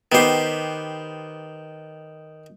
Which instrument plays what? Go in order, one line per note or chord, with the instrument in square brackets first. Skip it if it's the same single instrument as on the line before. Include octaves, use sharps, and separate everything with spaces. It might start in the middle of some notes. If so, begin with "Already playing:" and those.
[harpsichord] D#3 C5 [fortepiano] B3 G4